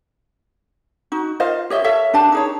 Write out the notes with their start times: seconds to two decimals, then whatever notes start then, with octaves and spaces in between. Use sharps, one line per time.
1.12 D#4 F#4
1.40 F4 C5 D#5 F5
1.70 G4 C#5 D#5 E5
1.84 A4 C#5 E5 F5
2.14 D4 G4 A5
2.32 D#4 G#4 C#5